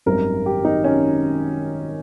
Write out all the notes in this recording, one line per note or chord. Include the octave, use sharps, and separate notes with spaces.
G#1 F#2 D#3 G3 A#4
G4
D#4
C#4